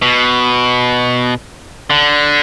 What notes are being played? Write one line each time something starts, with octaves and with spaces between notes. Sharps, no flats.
B2
D3